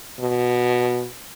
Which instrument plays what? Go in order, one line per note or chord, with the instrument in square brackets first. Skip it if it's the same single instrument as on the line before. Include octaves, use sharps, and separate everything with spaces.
[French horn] B2